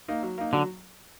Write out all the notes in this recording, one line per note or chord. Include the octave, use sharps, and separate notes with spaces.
A#3 D#4
F#3
A#3 D#4
D3 F#3